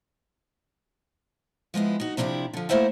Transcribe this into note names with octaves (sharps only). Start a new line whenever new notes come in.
F3 G#3 B3 E4
D#4 F#4
C3 F3 D4 E4 G4
D3 F3
A3 A#3 E4 C5 E5 F#5